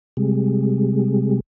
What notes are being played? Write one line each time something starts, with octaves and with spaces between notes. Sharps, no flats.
C3 G3 G#3